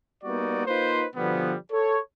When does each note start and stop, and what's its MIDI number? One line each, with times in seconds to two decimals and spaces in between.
0.24 0.63 55
0.24 0.63 58
0.24 0.63 59
0.24 0.63 63
0.24 0.63 66
0.24 0.63 74
0.67 1.05 58
0.67 1.05 63
0.67 1.05 65
0.67 1.05 71
0.67 1.05 72
1.16 1.54 47
1.16 1.54 50
1.16 1.54 53
1.16 1.54 55
1.16 1.54 59
1.71 1.98 69
1.71 1.98 73